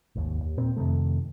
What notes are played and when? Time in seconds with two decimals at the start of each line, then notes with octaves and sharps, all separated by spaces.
0.15 G#1 D#2
0.42 D#2
0.57 A#2 C4
0.77 F2 C3 D#3 A3